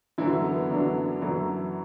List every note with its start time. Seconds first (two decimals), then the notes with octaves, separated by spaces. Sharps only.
0.18 F#2 D3 E3 F#3 E4
0.44 B3
0.70 F#2 D3 F#3 D4
1.21 F#2 D3 E3 F#3 E4